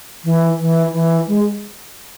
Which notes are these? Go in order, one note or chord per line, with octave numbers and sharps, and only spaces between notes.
E3
E3
E3
G#3